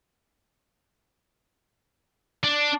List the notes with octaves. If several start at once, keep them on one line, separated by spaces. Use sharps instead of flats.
D4